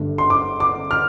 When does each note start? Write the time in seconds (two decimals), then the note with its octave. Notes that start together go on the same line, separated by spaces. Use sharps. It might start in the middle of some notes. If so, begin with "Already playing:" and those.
Already playing: G1 G2 D3 A3 D4
0.18 C6
0.30 D6
0.60 D6
0.91 F6